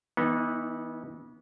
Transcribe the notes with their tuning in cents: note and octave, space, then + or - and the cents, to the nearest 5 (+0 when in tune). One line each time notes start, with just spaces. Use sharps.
E3 -30 B3 -25 D#4 +0